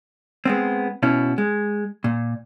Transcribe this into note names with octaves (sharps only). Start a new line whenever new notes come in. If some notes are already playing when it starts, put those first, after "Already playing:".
G#3 B3 C4
B2 C#4 E4
G#3
A#2